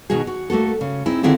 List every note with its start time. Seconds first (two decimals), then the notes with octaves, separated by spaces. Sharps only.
0.10 B2 D#3 D#4 F#4 G#4
0.27 F#4
0.50 A3 A#3 F#4 A4
0.81 C#3
1.06 C4 D#4 E4 G#4
1.23 D3 D#3 C4 E4 F4 G#4